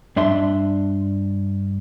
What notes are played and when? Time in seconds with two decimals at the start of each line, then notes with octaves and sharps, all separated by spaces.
0.16 G2 D4 E5 C6